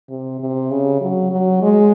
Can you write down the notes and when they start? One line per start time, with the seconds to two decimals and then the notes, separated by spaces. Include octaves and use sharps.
0.10 C3
0.40 C3
0.71 C#3
1.01 F#3
1.31 F#3
1.62 G#3